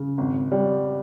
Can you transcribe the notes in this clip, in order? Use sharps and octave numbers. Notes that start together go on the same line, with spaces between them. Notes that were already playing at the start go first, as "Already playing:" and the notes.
Already playing: C#3
G#1
G3